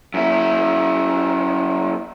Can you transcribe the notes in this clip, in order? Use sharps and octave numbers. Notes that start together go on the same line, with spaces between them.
F#2 E4